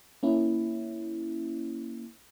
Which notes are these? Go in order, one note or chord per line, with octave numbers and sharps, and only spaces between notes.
A#3 C#4 E4